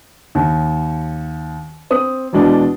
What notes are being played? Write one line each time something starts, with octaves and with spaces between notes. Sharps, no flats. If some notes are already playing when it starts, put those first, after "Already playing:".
D#2
C4 D#6
E2 B2 G#3 D4